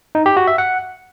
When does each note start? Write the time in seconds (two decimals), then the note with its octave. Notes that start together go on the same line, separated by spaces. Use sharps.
0.15 D#4
0.26 G4
0.37 F#4
0.47 E5
0.58 F#5